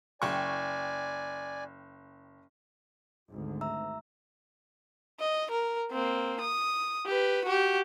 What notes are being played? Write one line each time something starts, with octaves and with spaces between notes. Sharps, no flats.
F#1 D5 G5 G#5 C#6
G#1 D2
E5 A#5 E6
D#5
A#4
A#3 C4
D#6
G4 B4
F#4 G4